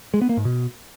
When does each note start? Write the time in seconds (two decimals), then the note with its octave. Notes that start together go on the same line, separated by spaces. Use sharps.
0.14 G#3
0.21 B3
0.29 A#3
0.37 G#2
0.45 B2